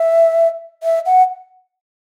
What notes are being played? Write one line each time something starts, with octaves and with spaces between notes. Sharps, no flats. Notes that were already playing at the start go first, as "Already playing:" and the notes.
Already playing: E5
E5
F#5